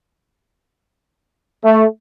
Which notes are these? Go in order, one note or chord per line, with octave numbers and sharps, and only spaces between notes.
A3